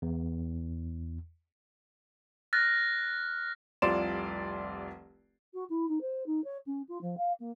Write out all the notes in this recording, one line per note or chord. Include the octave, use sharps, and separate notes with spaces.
E2
F6 F#6 A6 A#6
F1 C2 F4 D5 C6 E7
F#4
E4
D#4
C5
D#4
C#5
C#4
F4
F3
F5
A#3